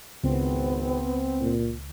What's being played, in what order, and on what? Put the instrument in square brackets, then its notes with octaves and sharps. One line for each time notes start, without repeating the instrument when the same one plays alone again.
[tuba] G#1 [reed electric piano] C#2 [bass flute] B3 [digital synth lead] C4
[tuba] A#2